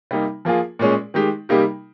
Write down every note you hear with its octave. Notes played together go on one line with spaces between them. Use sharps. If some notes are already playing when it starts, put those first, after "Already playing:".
C3 G3 A#3 D#4
F3 A#3 F4 G#4
A#2 G#3 C#4 G#4
D#3 G#3 D#4 G4
C3 G3 A#3 D#4 G4